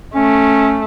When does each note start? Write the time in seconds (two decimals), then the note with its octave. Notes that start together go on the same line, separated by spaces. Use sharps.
0.15 A3 C#4